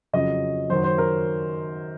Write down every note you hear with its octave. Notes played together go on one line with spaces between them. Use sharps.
F2 C#3 F#3 D#5
F#2 D#3 F#3 C5
C5
A#4